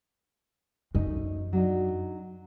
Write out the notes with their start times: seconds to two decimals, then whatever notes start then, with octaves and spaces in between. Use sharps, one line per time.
0.95 F#2 A3 D#4
1.53 F#3 D4 D#4